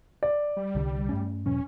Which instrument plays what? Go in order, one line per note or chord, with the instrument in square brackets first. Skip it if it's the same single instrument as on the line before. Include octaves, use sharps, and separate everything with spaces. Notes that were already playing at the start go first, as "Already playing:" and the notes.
[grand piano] D5
[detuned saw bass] G3
[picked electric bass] C2 D3
G2 A3 C#4
[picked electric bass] E1 B2 F#3 [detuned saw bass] C#4